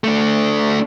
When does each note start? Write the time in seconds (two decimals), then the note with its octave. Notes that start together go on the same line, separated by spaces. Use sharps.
0.04 A3 D4